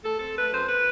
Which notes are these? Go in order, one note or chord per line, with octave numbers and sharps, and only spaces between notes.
A3 A4
C4 A4
A3 B4
F#2 C5
B4